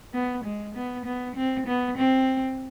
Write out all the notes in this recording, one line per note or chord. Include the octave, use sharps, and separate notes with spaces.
B3
G#3
B3
B3
C4
B3
C4